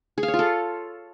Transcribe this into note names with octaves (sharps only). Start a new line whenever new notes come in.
G#4
F5
C#5
F4
A4